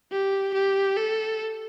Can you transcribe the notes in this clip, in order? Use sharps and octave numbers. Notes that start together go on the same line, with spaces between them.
G4
G4
A4